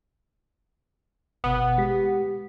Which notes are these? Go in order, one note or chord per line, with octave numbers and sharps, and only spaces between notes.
G1 B2 B3
G#3 G4 B6